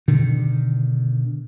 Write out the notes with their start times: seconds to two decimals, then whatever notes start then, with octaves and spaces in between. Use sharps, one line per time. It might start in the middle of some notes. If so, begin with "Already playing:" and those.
0.08 B2 D3 D#3